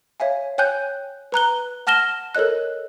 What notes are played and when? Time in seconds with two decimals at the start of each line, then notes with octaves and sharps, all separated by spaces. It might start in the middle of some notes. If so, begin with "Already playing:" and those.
0.20 C#5 E5 F5 G#5
0.58 C#5 G5 G#5 F#6 G6
1.32 B4 A#5 F#6 G7
1.87 F#5 A5 F6 A#6 E7 G7
2.35 A4 A#4 C#5 D#5 F#6